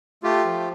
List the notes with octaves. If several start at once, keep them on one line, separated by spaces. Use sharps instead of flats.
A3 F4 G4
F3